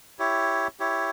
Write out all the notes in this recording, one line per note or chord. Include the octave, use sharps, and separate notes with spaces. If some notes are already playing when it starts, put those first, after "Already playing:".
E4 G4 C#5
E4 G4 C#5